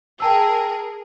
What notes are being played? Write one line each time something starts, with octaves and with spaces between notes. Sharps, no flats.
G#4 A#4 G5 A5 E6